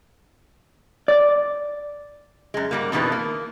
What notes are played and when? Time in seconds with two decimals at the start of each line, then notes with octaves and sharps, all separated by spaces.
1.08 D5
2.54 F#2 G#3
2.71 G#2 G3 A#3
2.92 F2 B2 D#3 E3 D4 B4
3.12 A#3